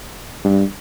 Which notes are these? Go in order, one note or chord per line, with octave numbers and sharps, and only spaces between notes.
G2